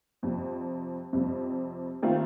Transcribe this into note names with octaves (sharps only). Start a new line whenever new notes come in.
F2 C3 G3
F2 C3 G3
D#3 A3 C4 F4